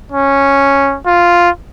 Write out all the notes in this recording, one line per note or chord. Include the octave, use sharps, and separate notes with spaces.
C#4
F4